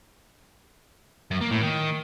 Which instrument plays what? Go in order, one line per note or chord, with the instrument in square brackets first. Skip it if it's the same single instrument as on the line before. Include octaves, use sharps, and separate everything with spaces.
[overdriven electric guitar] F#2
A#3
A2
D#3